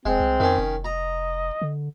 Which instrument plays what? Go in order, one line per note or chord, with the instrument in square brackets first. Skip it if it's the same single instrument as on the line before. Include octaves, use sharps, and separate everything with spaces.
[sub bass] F1 [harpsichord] G#3 [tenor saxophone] C4
[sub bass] C2
[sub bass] F2 [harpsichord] D#3 C#4
[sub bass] F1
[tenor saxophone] D#5 [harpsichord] A#5
[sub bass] D3